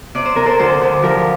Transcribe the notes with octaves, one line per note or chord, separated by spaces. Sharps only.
C3 D5
C5
C3 A#4
A4 C5
D2 A4 C5
D2
F3 G4 A#4